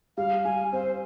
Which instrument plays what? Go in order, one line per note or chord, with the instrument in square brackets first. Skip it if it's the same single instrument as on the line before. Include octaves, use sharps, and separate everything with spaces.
[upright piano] G3 [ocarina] F5
[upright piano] G3 [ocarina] G#5
[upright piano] C4 [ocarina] C5